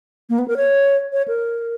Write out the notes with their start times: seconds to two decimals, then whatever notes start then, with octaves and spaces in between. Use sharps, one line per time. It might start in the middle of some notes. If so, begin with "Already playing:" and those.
0.30 A#3
0.39 B3
0.48 A#4
0.57 C#5
1.13 C#5
1.28 A#4